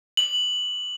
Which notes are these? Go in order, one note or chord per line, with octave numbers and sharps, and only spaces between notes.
F#7